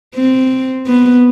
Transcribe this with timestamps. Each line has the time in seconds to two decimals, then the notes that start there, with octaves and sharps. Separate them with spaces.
0.15 C4
0.87 B3